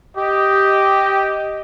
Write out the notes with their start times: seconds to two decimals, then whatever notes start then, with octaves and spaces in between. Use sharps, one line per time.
0.17 G4 D#5